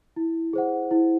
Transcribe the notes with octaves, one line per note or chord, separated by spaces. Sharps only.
E4
G#4 C5 F#5
E4